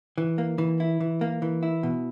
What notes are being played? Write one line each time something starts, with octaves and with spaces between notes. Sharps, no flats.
E3
A#3
E3
E4
E3
A#3
E3
E4
B2